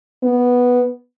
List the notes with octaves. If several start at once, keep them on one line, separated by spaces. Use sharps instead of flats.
B3